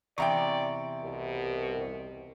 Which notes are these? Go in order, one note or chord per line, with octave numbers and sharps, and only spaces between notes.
E2 C3 D5 E5 G5 A#5 C#6
C2 B2